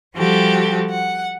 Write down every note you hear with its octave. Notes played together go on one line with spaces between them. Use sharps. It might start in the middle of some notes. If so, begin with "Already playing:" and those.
F3 G3 F#4 G4 A4
F#5